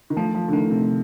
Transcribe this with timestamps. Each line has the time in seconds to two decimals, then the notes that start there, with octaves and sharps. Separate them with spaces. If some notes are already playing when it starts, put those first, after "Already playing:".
0.10 D#3
0.17 F3 A3
0.35 F3
0.48 D3
0.53 D#3 A3
0.70 C3